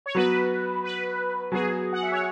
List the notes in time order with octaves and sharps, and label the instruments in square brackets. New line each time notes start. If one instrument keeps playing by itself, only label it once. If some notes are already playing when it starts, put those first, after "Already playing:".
[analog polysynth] C#5
[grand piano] F#3 B3 F#4 [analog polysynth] B4
[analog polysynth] B4
[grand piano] F#3 B3 F#4 [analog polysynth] G#4
[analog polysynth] F#5
E5
C#5